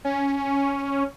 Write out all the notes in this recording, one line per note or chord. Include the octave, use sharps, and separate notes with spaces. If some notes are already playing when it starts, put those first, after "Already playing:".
C#4